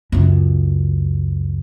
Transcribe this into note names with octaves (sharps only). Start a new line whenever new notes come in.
C#2 F#2